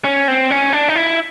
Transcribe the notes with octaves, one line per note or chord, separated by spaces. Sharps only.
C#4
C4
C#4
D4
D#4
E4